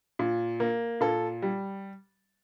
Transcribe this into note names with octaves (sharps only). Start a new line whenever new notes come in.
A#2
A#3
A#2 A4
G3